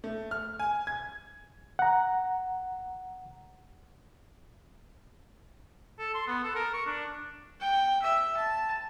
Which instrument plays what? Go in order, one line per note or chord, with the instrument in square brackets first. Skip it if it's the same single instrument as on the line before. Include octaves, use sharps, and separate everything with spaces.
[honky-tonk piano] A3
F6
G#5
G#6
[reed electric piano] F#5 A#5
[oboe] A4
C6
B3
A4
A#4
C#6
D4
[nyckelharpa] G5
E5
A5